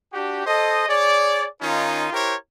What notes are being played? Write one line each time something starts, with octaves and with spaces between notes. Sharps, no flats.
D4 F#4 G4
A4 C5 D#5
G#4 C#5 D5
D#3 C#4 D#4 F4
E4 G4 A#4 C5 C#5